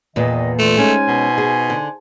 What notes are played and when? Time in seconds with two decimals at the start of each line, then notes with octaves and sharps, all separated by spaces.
0.16 E2 A#2 D#3 B3 D#5
0.59 E3 A3 F4
0.78 G#3 C#4 D#4 C5 G#5
1.08 B2
1.38 G#4
1.70 D3